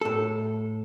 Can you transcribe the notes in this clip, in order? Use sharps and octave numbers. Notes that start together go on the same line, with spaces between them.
A2 A4